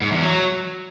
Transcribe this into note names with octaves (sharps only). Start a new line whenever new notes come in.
G#2
E2
F#3